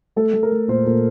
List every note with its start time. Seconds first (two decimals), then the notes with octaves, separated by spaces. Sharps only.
0.16 A3 A4
0.33 A3
0.43 A#4
0.52 A3
0.68 A#2 C5
0.86 A#2